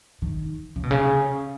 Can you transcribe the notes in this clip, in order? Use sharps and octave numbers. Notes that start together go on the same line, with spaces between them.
D#3
C#3
B2
C#3